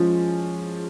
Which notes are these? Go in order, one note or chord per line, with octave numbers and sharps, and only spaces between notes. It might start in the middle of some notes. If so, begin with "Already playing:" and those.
Already playing: F3 G#3 C#4